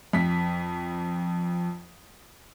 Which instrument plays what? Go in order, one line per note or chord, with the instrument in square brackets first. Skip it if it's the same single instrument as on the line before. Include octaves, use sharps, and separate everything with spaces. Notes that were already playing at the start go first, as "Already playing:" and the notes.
[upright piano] F2 B6